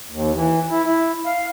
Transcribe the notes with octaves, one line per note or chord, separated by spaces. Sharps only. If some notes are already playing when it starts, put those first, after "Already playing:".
D#2
E3
E4
E4
F5